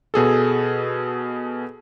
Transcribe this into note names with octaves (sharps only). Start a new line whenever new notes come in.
B2 G#4 A4